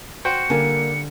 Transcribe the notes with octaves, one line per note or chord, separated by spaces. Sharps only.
F#4 C5 G5 C#7
D3 G3 A#3 G#5